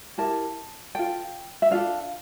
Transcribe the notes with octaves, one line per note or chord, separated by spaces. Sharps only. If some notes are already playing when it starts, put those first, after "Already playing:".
E4 G4 A#4 A5
F4 A4 G5
E5
D4 F4 A4 F5